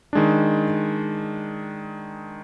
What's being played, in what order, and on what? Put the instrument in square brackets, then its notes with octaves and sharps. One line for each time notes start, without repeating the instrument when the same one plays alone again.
[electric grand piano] D#3 G#3 D4